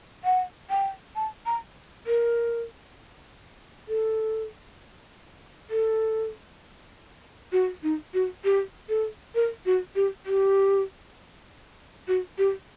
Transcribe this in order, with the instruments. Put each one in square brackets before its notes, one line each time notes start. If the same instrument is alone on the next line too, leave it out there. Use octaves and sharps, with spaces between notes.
[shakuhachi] F#5
G5
A5
A#5
A#4
A4
A4
F#4
D#4
F#4
G4
A4
A#4
F#4
G4
G4
F#4
G4